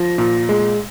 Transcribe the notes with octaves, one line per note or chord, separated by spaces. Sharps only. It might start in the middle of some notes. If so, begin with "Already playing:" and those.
Already playing: F3 A#6
A#2
G#3